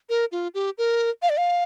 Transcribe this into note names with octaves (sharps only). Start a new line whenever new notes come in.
A#4
F4
G4
A#4
F5
D5
F5